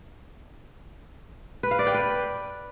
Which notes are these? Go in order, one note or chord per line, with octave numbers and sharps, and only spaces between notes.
B4
F5
D5
G5
B4